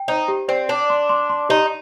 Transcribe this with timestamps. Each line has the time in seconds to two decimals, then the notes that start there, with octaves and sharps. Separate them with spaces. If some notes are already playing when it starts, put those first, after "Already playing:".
Already playing: G5
0.08 D#4 C5
0.28 G4
0.48 C4 D5
0.69 D4 A5
0.90 C6
1.09 C6
1.30 C6
1.49 D#4 G4